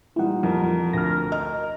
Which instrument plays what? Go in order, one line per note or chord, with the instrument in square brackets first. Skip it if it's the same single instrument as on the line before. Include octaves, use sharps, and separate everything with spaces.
[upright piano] A#2 E3 G3 [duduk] D#4 [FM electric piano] E4 F#5
[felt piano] F2 [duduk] A#4
[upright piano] D2 [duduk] A#4 [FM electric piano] F6 A#6
[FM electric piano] D#5 [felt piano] F6